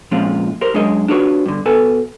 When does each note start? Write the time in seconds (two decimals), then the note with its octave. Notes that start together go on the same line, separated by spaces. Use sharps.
0.11 A#2 F3 G#3 C4 C#4 F4
0.61 G4 A#4 C5
0.74 F#2 G#3 D4 G#4 C#5 D#5
1.08 D4 F4 F#4 G#4 B4 C#5
1.46 G2 D3
1.66 B2 A4 B4 G#5